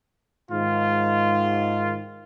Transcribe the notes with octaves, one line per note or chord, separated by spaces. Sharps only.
G#2 D#3 F4